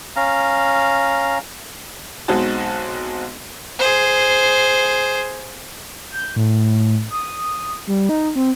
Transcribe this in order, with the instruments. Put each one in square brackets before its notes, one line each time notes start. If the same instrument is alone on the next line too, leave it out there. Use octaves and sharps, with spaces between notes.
[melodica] C#4 F5 A#5
[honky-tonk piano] B1 G#3 C4 D#4 F#4 A5
[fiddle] G#4 C5
[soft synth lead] G6
A2
D#6
G3
D#4
C4